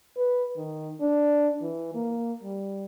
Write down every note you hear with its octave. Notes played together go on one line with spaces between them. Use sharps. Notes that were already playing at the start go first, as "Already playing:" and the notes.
B4
D#3
D4
E3
A#3
G3